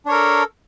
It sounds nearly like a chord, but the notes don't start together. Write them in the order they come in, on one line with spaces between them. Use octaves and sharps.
D4 C#5 A#4 A4